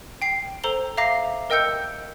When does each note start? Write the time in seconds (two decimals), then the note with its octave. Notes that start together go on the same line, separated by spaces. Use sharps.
0.22 G5 C7
0.64 A4 C5 A#5 F7 G7
0.97 E5 F5 A#5 D6 A#6 C7
1.50 A#4 D#5 G5 E6 G6 C#7